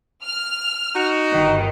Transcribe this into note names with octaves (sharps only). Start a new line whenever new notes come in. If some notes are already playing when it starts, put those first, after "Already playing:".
F6
D#4 F#4
G1 D#3